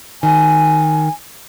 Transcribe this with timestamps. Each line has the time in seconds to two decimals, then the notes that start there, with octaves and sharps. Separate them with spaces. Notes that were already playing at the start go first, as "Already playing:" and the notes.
0.23 D#3 G#5